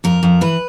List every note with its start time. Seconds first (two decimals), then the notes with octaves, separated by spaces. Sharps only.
0.04 F2 A#4
0.23 F2
0.41 E3 B4